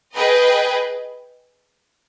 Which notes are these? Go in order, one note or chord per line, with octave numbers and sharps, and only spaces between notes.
G#4 B4 D#5 G5